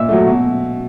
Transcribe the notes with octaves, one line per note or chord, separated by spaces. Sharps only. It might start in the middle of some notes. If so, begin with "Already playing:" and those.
Already playing: A#2 E5 E6
F#3 A3
B2